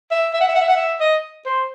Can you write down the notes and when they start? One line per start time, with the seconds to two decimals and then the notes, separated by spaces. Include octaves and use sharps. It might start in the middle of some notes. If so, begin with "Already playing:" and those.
0.11 E5
0.33 E5
0.41 F#5
0.48 E5
0.55 F#5
0.61 E5
0.68 F#5
0.76 E5
1.01 D#5
1.46 C5